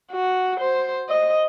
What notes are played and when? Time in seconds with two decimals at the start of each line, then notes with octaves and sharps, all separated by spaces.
0.11 F#4
0.60 C5
1.09 D#5